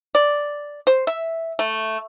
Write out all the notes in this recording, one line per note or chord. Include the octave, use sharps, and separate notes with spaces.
D5
C5
E5
A3